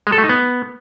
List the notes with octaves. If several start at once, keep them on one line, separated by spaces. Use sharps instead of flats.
G#3
A4
A3
D#4
B3